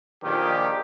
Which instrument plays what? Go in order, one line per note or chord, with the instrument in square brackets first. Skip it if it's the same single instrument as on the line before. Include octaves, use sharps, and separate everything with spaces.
[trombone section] A#1 A#2 D#3 [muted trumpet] G4